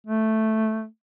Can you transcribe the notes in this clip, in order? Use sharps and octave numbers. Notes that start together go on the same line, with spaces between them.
A3